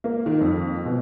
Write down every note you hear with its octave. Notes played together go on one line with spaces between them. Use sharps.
A#3
D#3
F2
B2